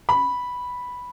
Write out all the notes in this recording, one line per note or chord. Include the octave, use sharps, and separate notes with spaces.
B5